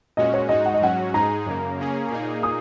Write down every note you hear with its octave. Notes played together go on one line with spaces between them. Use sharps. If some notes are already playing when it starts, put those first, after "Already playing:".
A#2 G#3 C#4 F#4 D#5
C#5
G#2 G#3 D#4 F#4 D#5
F#5
D#5
G#2 F#3 C#4 F#4 F#5
G#2 G#3 D#4 G#4 A#5
F#2 C#3 A#3
C#3 A#3 C#4 G#4
A#2 A#3 D#4 G#4
D#6